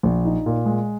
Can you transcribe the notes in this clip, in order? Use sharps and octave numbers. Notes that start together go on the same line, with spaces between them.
A#1
D#4
A#2
G#3